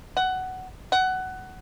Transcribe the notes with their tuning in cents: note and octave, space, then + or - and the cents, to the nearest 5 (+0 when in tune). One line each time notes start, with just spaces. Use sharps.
F#5 +15
F#5 +15